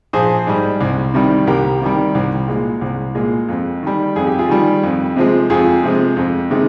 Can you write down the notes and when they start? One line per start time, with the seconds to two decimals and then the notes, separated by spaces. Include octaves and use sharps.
0.13 A#1 G#4 C5
0.47 G#2 G3
0.81 C2
1.14 C3 D#3 G3
1.47 C2 G4 A#4
1.81 C3 D#3 G3
2.15 C2
2.48 A#2 G#3
2.81 C2
3.15 A#2 G#3
3.49 F2
3.83 D#3 G3
4.16 F2 G#4
4.27 G4
4.39 F4 G#4
4.49 D#3 G3
4.83 F2
5.16 C3 F3 G#3
5.50 F2 F4 G#4
5.84 C3 F3 G#3
6.17 F2
6.51 C3 D#3 G#3